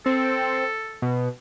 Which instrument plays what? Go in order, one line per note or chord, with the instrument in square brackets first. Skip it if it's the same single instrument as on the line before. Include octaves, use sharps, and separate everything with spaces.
[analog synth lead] C4 [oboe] A4
[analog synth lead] B2